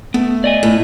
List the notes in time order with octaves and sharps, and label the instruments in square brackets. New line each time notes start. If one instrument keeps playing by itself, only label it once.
[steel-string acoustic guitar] A3 [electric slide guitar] B3
[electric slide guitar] D5 D#5 G#5
[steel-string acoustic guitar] A2